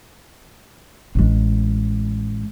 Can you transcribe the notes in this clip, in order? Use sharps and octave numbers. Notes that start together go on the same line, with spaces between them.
A1 G#3